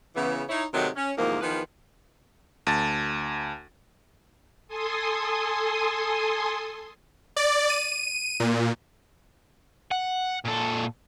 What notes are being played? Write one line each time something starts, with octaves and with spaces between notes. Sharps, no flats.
C#3 E3 B3
D#4 E4 C#5
G#2 C3 D#3 F#3 G#3 A3
C#4
E2 G#2 C3 D#3 F3 A#3
E2 D#3 F3 B4
D2 A5 A6
A4 G#5 C6 D#6
D5
D#7
A#2
F#5
A#2 A4